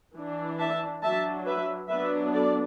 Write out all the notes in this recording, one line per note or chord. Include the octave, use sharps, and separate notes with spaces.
E3 D4
E5 A5
F#3 D4 E5 A5
B4 E5
F#3 B3 D4 B4 E5
A4 D5